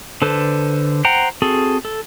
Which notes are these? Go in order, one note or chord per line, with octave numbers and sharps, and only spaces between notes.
D3 A4 B4 C5
C5 F#5 G5 A#5
C4 F#4 G#4 A4
A4